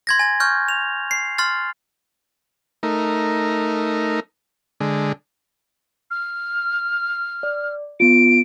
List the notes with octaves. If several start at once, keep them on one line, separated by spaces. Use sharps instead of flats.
C6 G#6 A#6
G#5 A6
C#6 F6 G6
F7
C7
C6 F6 A6
A3 D#4 A#4
D3 G#3
F6
D5
B3 F4 D7